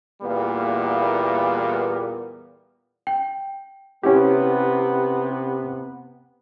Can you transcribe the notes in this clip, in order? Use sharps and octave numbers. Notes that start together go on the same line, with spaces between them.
E2 A#2 E3 G3 A#3 B3
G5
C3 B3 C#4 E4 G4